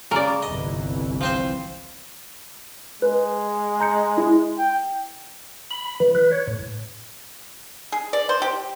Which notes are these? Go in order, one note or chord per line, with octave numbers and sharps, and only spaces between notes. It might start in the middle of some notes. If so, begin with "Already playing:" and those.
C#3 A#4 D5
G1 C2 E3 D#5
F3 C4 C5
G#3 B4
A#5 G6 C#7
E4
G5
B5
E3
B4
C#5
A2
G#4
D5
C5
G4